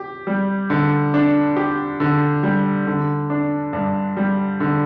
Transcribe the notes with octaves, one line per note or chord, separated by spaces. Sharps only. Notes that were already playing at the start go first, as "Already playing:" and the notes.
Already playing: G4
G3
D3
D4
G4
D3
G3
D3
D4
G2
G3
D3